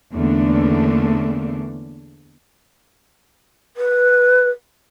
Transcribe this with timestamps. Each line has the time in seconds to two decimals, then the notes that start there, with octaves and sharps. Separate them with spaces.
0.13 E2 D3 A3 A#3 C#4 D4
3.77 B4